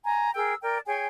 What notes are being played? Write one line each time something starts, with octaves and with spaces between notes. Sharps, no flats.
G#5 A#5
G#4 A#4 G5 E6
A#4 D5 G5
G#4 C#5 G5 G#5